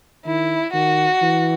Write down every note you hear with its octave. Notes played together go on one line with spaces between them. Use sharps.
D#3 E4
D#3 F#4
E3